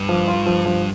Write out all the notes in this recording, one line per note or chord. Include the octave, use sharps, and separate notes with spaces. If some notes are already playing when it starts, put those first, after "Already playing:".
Already playing: G2
F3
F4
F3
F3